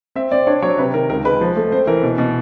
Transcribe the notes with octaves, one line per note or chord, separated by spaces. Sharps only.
C4 E5
C4 D5
D4 C#5
F#3 C#5
C3 B4
D#3 A#4
C#2 A#4
G#3 B4
F3
A3
C4 C5
E3 A#4
B2
B2